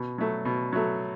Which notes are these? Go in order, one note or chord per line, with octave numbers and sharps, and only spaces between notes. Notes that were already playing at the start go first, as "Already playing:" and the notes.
Already playing: B2
F#3 A3
B2
F#3 A3